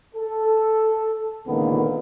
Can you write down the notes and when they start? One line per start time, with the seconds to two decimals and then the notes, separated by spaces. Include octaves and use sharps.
0.15 A4
1.47 C#2 A#2 D3 D#3 A#3 B3